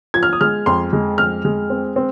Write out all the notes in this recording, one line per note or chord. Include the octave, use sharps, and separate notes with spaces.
F3 G#6
F6
D#6
G#3 F6
F2 C6
G#3
F2 F6
G#3
C4
C4